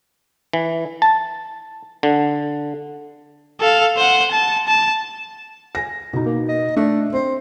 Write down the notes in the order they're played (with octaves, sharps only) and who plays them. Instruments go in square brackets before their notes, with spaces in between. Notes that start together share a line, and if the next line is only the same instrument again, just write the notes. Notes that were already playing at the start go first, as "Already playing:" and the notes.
[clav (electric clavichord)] E3
A5
D3
[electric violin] A4 F5
C5 F#5
A5
A5
[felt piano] G#5 A#6
B2 D#4
[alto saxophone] A#3
D#5
[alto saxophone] A3 [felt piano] D4
[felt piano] C4 [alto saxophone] C5